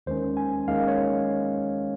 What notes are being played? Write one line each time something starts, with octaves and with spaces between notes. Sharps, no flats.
D#2 D#3 G#3 C#4 C5
G#5
D#2 D#3 G#3 C#4 F5
C#5